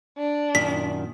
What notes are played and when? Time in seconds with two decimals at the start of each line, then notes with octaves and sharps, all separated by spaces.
0.17 D4
0.55 F#2 A#2 D#3 B6